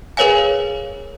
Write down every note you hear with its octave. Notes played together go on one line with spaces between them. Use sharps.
G#4 A#4 B4 C#5 F5 G#5